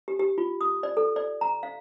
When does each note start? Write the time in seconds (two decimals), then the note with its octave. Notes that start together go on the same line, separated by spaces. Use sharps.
0.08 G4
0.19 G4
0.38 F4
0.61 D#6
0.83 D5
0.97 A4
1.16 D5
1.41 A#5
1.63 F5